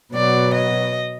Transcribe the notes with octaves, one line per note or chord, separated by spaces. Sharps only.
B2 F#3 B3 D5
D#5